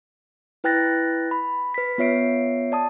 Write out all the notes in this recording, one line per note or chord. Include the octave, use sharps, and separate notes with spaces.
E4 B4 G5 F#6 A6 A#6
B5
B4 B6
B3 F4 C#5 E5 C7 D7
D5 A5 D#6